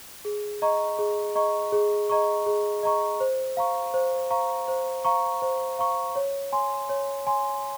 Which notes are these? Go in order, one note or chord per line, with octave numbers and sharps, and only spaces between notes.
G#4
D#5 A#5 C#6
G#4
D#5 A#5 C#6
G#4
D#5 A#5 C#6
G#4
D#5 A#5 C#6
C5
F5 A#5 C#6
C5
F5 A#5 C#6
C5
F5 A#5 C#6
C5
F5 A#5 C#6
C#5
G#5 C6
C#5
G#5 C6